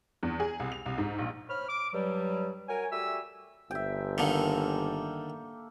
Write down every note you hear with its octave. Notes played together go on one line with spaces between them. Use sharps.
E2
G#4
C2
F7
C2
G#2
A#1
C5 C#5 B5 F6
D6
G2 F#3 G3
F#4 A#4 C#5 G#5
G3 A3 F#4 E5 G#5 E6
G1 E5 G5
D3 D#3 A#3 A4